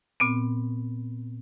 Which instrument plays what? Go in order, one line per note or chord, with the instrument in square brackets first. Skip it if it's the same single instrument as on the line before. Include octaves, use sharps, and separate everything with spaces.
[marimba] A#2 B3 C4